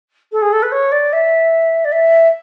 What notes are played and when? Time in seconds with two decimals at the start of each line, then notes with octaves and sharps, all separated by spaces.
0.32 A4
0.41 G#4
0.52 A4
0.62 B4
0.71 C#5
0.91 D5
1.12 E5
1.84 D5
1.91 E5